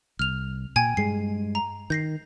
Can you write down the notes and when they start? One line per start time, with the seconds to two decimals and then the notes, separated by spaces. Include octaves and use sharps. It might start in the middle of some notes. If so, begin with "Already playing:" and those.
0.19 C2 F6 F7
0.76 A#2 G5 G#5 G#6
0.97 G2 G#3 C7
1.55 A#5
1.90 D#3 G6 A#6 C7